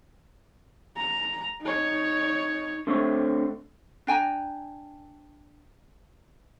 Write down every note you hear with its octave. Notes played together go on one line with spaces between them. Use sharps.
A#5
D#4 C#5
D3 A3 C4 C#5
D4 G5 G#5 A#5